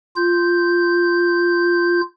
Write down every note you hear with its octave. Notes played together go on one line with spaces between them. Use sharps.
F4 G6